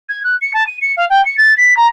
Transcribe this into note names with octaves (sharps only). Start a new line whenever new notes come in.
G#6
F#6
C#7
A5
D#7
C#7
F5
G5
C#7
A6
B6
A#5